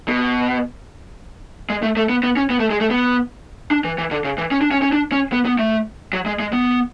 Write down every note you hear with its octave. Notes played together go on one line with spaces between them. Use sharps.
B2
G#3
A3
A3
B3
B3
C#4
B3
A3
G#3
A3
B3
D4
E3
E3
D3
C#3
E3
C#4
D4
C#4
C#4
D4
C#4
B3
B3
A3
F#3
G#3
G#3
B3